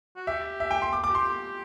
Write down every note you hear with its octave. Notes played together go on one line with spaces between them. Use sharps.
F#4
G4 E5
E5
G5
C6
D6
D6
G4
C6